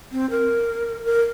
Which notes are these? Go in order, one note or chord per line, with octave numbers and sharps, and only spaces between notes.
C4
A#4
A#4